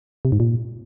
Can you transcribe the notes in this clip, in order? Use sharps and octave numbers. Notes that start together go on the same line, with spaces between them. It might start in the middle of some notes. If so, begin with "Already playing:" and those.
C3
G#2
A#2